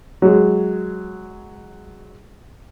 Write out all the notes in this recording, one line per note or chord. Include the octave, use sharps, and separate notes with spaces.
F#3 G#3